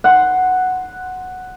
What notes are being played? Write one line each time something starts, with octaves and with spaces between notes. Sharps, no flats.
F#5 C6